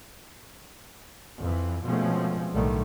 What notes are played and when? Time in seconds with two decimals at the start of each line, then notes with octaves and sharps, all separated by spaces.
1.39 F2 E3
1.84 B2 F3 G#3 A3 C4 C#4
2.52 B1 A2 D3 D#3 G3 A3